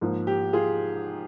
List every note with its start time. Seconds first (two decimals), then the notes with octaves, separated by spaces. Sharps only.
0.01 G#2 F3 A#3
0.27 G4
0.53 F4 G#4